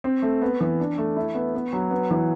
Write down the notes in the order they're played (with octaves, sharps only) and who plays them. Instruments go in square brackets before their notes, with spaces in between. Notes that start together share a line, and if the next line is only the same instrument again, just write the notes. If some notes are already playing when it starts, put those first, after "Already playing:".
[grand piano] C4
A3
B3
E3
D4
A3
E4
B3
B3
F#3
B3
E3